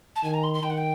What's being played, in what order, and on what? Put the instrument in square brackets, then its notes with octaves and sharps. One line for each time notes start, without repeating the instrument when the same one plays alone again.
[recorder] A5
[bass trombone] D#3 [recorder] G#5
[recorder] A#5
C6
C6
[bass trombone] D#3 [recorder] G5
[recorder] F#5
G5